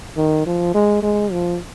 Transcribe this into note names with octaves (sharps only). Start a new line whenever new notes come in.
D#3
F3
G#3
G#3
F3